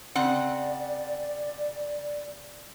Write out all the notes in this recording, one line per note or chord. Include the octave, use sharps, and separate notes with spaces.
C#3 C4 D5 F#5